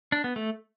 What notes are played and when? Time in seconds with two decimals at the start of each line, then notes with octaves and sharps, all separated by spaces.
0.12 D4
0.24 B3
0.36 A3